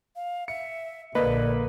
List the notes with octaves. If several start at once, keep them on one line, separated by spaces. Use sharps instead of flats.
F5
E5 C#7
A#1 D3 A#3 B4 D5 D#5